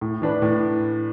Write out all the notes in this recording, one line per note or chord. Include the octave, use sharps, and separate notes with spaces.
A2
E3 D4 B4
A2